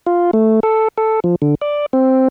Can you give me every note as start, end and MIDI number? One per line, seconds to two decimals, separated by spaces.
0.07 0.31 65
0.33 0.60 57
0.63 0.88 69
0.98 1.20 69
1.24 1.36 53
1.42 1.55 50
1.62 1.86 74
1.93 2.28 60